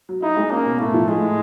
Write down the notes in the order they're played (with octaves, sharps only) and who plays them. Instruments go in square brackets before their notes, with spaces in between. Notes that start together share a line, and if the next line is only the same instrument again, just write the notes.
[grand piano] F#3
[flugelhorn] D#4 [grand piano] E4
[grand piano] G#3
[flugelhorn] A#3 [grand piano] C#4
[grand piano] B2
[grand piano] A2 [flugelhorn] A3
[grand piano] F3
[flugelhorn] G#3 [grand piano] A3
[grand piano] A2